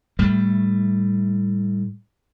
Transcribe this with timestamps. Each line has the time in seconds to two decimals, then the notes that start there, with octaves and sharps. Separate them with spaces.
0.19 A2 G3 A3